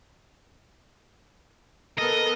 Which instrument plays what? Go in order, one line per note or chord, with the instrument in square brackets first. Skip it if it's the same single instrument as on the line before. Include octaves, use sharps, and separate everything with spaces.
[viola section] B3 A4 A#4 [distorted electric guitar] D#5